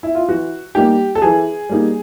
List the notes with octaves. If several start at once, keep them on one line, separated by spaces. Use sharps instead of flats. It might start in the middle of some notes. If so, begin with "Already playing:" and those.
E4
F4
E3 F#4
G3 A#3 D#4 G4
A4
E3 G#4
G3 A#3 D#4